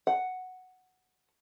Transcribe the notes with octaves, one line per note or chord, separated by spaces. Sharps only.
F#5